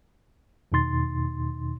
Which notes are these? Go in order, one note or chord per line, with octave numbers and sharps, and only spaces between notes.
E2 B2 D#3 D#4 C6 A6